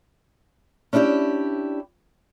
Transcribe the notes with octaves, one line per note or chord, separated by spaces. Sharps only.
C#4 D4 E4 F#4 G4